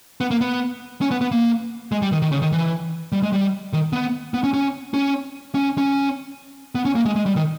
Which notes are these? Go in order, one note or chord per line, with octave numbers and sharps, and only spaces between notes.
B3
A#3
B3
C#4
B3
B3
A#3
G#3
G3
D#3
D#3
C#3
D#3
E3
G3
G#3
G3
D#3
B3
B3
C#4
C#4
C#4
C#4
C#4
B3
C#4
A#3
G#3
G#3
G3
D#3